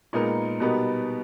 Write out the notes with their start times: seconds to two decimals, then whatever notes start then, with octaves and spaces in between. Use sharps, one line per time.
0.13 A#2 G#3 B3 D#4 A#4
0.60 B2 G3 B3 D#4 A#4